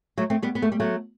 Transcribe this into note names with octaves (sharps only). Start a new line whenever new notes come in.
F#3 A3
A3 C4
G3 B3
B3
A3
G3
F#3 A3